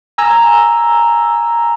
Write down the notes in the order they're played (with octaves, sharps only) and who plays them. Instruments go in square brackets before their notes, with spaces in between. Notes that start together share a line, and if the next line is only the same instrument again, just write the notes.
[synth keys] G#5 A#5 E6